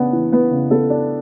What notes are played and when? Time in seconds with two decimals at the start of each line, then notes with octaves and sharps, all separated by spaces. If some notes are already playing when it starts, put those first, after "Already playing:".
Already playing: C#3 B3 D4 F#5
0.13 E3
0.32 B3 B4
0.51 C#3
0.71 B3 A4
0.90 D4